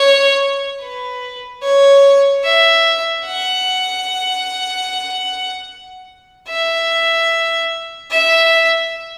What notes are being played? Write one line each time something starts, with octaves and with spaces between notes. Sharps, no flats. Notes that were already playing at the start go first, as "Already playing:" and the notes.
Already playing: C#5
B4
C#5
E5
F#5
E5
E5